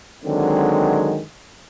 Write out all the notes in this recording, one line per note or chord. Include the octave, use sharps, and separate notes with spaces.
D3 D#3 F#3 G#3 C4